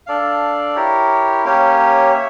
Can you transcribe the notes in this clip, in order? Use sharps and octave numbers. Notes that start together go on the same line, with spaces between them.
D4 A4 D5 F5
E4 G4 A#4 C#5
A#3 C#4 G4 C#5
C#5 E5